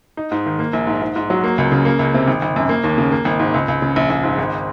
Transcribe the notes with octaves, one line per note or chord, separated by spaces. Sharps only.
D#4
G#2
D#3
A#3
A#1
G#2
G#2
G#2
F#3
A#3
C#2
C#3
A#3
C#2
C3
G#1
G#1
F#2
A#3
D#2
C#3
A#3
G#1
G#2
C#2
C#2
C#3
A#1
A#1
G#2
G#1